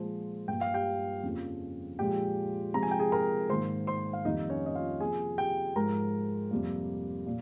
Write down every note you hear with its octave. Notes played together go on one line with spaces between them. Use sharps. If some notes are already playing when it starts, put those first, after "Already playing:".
Already playing: A#2 F3 G#3 C5
G2 G3 A#3 G5
F5
G4 G5
F2 C#3 F3 A#3
A#2 F3 G#3 G4 G5
C3 F3 G#3 A#5
G#5
G5
G#4 G#5
A#4 A#5
G#2 D#3 A#3 C5 C6
C5 C6
F5
F2 D#3 G3 A#3 D#4 D#5
C#4 C#5
D#5
F4 F5
C3 F3 A#3 G#4 G#5
G4 G5
G#2 F3 G#3 A#4 A#5
F2 C3 G3 A#3
A#2